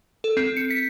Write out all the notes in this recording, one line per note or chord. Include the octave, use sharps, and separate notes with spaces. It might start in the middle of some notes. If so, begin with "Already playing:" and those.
A4
C4
C#7
B6